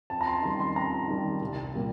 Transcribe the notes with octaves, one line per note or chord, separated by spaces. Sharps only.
F2 A5
A#5
C6
D#3 G3 C6
C6
F2 A#5
D#3 G3
C2
A#2 G3 A#3